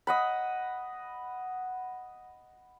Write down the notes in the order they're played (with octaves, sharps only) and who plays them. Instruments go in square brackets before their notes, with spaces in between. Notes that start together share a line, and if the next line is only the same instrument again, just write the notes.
[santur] D#5 F#5 B5